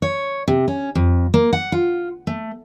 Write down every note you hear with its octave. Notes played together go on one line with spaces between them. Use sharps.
C#5
C3
C#4
F2
A#3
F#5
F4
A3